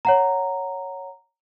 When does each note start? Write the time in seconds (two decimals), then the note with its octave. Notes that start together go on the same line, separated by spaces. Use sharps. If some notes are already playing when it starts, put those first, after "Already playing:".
0.05 C#5 F#5 A#5